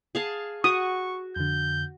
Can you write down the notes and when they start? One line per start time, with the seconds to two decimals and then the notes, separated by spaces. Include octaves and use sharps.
0.15 G#4 F5 A5
0.64 F#4 C#6 D#6
1.36 F2 D3 G6